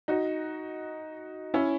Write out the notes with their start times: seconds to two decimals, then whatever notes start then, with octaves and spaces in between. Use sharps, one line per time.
0.08 D#4 F#4
1.54 C#4 E4